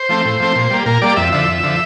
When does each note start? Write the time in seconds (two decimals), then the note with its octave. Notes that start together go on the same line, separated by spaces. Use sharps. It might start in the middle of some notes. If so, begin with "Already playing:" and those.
Already playing: C5
0.09 F3 A3 C4
0.25 A2
0.40 F3 A3 C4
0.55 A#2
0.70 G3 A#3
0.86 A#2 A#4
1.02 G3 A#3 D5
1.17 F2 E5
1.32 D3 F3 E5
1.47 F2
1.64 D3 F3